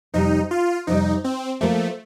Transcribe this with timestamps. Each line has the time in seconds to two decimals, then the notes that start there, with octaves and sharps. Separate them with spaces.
0.14 F2 C3 G3 D#4
0.51 F4
0.87 F2 C3 G3 D#4
1.24 C4
1.61 F3 A3 A#3 F4 A#4